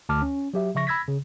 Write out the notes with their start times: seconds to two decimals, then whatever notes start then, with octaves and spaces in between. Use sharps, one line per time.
0.09 D2 A5 D6 F6
0.22 C#4
0.54 F#3 G4 E5
0.75 C#3 F3 E5 C#6 A#6
0.87 B5 E6 G#6 A#6 B6
1.08 C#3